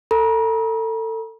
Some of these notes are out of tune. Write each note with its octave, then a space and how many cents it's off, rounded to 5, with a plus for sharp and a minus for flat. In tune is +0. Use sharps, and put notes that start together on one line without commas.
A4 +30 A#5 +45